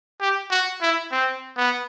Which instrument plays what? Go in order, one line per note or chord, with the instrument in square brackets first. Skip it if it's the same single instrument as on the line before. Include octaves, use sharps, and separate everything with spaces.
[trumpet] G4
F#4
E4
C4
B3